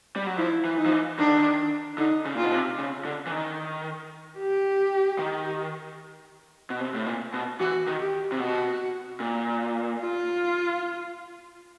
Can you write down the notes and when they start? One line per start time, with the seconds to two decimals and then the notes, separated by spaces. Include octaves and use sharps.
0.16 G3
0.26 F#3
0.38 F3 E4
0.65 E3
0.78 D#4
0.86 F3
0.91 E3
1.19 D#3 D4
1.27 D3
1.37 D#3
1.98 D3 D#4
2.25 C#3
2.35 A#2 F4
2.43 B2
2.52 C3
2.79 C#3
3.05 D3
3.27 E3
3.32 D#3
4.39 G4
5.19 D#3
6.70 B2
6.80 C3
6.95 A2
7.06 A#2
7.34 B2
7.59 E3 F#4
7.87 D#3
8.01 G4
8.32 C3
8.40 B2 F#4
9.20 A#2
10.01 F4